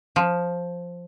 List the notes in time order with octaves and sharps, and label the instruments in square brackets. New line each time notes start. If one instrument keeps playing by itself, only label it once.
[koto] F3